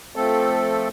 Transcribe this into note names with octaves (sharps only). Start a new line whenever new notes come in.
F3 A3 C4 A4